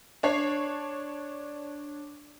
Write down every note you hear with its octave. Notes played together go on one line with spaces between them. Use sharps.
D4 C#5 C7